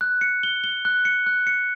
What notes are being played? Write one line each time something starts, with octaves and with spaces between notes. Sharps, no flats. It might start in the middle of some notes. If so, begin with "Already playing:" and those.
F#6
C#7
G7
G7
F#6
C#7
F#6
C#7